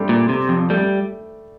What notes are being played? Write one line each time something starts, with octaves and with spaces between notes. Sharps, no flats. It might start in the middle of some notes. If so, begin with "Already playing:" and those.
Already playing: G3 A3 C4 D4
A#2
C3
F2
G3 A3